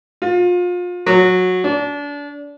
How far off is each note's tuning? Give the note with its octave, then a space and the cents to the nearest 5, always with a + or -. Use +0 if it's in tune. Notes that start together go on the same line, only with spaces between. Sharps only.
F4 +30
F#3 -15
D4 -30